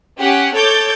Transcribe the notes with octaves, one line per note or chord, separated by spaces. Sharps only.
C#4 G4 F#5
A4 C#5 D6 G6 A6